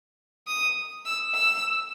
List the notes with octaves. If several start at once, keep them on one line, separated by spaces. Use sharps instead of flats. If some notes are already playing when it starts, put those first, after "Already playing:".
D#6
E6
E6